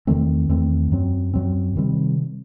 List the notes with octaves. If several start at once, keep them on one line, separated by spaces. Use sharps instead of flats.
E2 D#3 A3 C4
E2 D#3 A3 C4
F#2 F#3 C4
F#2 F#3 C4
C3 D#3 G3 C4